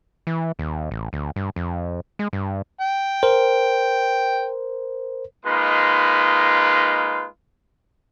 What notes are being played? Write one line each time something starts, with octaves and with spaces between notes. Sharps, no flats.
E3
D#2
A1
D2
G2
F2
G#3
G2
G5
A#4 C5
G#3 A#3 D#4 F4 B4 B5